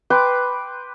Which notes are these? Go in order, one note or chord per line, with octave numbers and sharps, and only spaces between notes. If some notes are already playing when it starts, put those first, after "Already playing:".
B4 G5 C6 D6